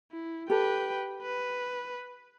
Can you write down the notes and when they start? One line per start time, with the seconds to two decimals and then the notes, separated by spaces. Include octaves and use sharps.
0.11 E4
0.50 G4 A4 B4 G5
1.22 B4